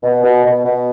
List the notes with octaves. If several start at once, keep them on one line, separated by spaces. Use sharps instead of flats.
B2
B2
B2
B2